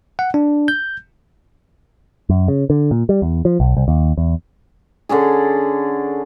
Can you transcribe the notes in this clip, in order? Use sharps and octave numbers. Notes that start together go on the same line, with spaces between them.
F#5
D4
G6
F#2
C#3
D3
A#2
G3
E2
F3
B1
C2
D#2
E2
D3 C#4 D4 G#4